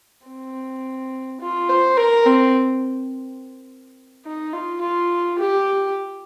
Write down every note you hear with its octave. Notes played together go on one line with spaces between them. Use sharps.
C4
F4
C5
A#4
C4
D#4
F4
F4
G4